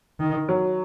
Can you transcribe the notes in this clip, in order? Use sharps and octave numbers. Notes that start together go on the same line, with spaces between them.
D#3
F#3